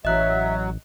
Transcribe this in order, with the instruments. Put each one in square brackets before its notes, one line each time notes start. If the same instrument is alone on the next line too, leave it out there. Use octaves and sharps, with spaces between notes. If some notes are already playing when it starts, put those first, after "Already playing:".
[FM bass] A1 [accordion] F#3 [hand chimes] D#5 F#6 [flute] E5